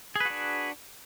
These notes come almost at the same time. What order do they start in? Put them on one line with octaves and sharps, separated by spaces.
G#4 B4 F#4 D4